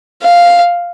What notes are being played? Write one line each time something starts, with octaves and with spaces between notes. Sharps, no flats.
F5